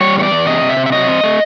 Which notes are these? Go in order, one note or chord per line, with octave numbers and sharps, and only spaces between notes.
G3 C#5
E2 C#5
D5
E2
C3 D#5
C3
E5
C3
E5
F#3 D#5
C4
A3